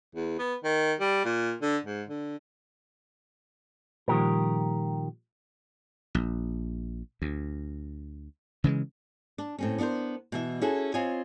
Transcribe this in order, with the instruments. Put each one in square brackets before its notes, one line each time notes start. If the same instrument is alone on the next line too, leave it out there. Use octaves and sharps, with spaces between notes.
[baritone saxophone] E2
B3
D#3
G3
A#2
D3
G#2
D3
[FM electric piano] A#2 F3 G3 [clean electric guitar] D#3 G4 A#4
[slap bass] A#1
D2
C#3 E3 G3 G#3
[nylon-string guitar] D4
A2 C4 C#4
B3 D4 F4 A#4 C5
B2 E3 E5
C#4 E4 F#4 G#4 A4
C4 F4 C#5 D#5 G#5